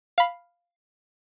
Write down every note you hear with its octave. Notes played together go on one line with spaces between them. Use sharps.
F5 B5